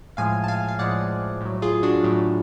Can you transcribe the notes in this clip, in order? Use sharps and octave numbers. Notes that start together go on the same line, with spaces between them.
A2 F3 G#3 F5 G#5
A5
F5 G#5
F5
A2 F3 G#3 D5 F#5
A2 F#3
F4 G#4
D4 F#4
A2 F#3